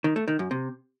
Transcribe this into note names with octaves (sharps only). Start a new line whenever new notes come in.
D#3
A3
D#3
F#2
C3